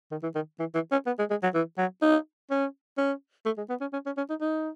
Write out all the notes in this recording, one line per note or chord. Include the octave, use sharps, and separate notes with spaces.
D#3
E3
D#3
E3
E3
C#4
B3
G#3
G#3
F#3
E3
F#3
D#4
C#4
C#4
A3
G#3
B3
C#4
C#4
C#4
C#4
D#4
D#4